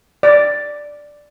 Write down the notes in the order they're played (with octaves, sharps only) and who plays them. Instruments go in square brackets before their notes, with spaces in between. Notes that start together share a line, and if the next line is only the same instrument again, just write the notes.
[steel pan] D5